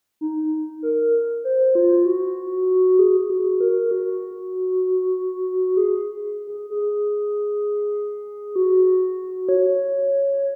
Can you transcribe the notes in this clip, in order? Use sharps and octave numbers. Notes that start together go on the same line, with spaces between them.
D#4
A#4
C5
F4
F#4
G#4
F#4
A#4
F#4
G#4
G#4
G#4
F#4
C#5